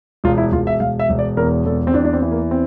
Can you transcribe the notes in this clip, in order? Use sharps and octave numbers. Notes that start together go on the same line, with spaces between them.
E1 F4
E4
E1 F4
E5
E1 F5
E5
E1
D5
E2 A#4
E2 A4
C4
E2 D4
D4
C4
E3
A#3
C4